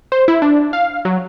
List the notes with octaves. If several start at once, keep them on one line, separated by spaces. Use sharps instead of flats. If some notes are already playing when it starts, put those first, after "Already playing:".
C5
E4
D4
F5
F#3